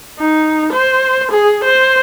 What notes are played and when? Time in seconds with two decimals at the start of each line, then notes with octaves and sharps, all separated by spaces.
0.19 D#4
0.73 C5
1.32 G#4
1.65 C5